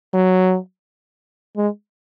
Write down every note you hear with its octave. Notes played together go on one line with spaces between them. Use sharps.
F#3
G#3